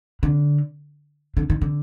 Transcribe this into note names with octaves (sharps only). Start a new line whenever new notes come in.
D3
D3
D#3
D3